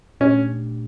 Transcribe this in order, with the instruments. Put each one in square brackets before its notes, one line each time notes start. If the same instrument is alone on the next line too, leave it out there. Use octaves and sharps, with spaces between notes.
[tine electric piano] A#2 A3 D4 G4 [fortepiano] C#4